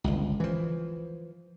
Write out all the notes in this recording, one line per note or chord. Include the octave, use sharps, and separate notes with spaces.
G1 C#2
E3 F3